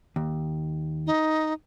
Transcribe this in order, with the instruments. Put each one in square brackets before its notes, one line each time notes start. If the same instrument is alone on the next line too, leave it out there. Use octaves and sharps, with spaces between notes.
[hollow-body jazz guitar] D#2
[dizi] D#4